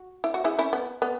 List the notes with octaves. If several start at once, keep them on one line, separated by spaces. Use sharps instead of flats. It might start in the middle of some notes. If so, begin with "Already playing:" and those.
Already playing: F#4
E4
F#4
E4 G#4
C#4 E4
B3
B3